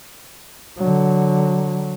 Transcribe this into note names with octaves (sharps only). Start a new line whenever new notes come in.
D3 F#3